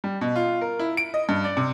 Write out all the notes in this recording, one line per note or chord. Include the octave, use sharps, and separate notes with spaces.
G3
B2
F4
A#4
E4
D7
D#5
G2
D5
C3